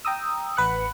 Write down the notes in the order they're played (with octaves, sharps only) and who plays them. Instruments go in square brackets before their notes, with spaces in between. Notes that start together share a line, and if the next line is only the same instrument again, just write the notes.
[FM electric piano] G5 A#5 D#6 E6
A1 B4 F#5 F#6 C#7